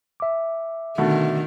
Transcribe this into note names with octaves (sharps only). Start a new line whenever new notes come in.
E5 D6
B2 D3 D#3 A3